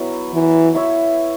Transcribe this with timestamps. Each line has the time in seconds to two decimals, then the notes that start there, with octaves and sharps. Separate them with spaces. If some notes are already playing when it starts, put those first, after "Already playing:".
Already playing: F#3 B3 E4 C#5
0.34 E3
0.74 E4 C#5 E5